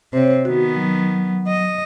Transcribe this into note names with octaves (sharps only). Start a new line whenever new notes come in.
C3 C4 C5 C#5
D#3 B3 F#4
F#3
D#5